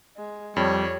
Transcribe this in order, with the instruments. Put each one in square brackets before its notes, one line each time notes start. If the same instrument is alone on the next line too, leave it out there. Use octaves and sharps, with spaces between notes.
[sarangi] G#3
[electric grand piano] F2 [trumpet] G3 [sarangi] C#5